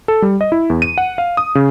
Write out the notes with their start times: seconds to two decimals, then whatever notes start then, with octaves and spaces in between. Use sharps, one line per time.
0.08 A4
0.22 G3
0.41 D#5
0.52 E4
0.70 E2
0.82 D#7
0.98 F#5
1.18 F5
1.37 D#6
1.55 C#3